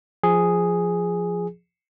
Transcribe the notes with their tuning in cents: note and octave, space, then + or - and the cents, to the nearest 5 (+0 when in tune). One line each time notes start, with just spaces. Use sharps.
F3 +0 G#4 +0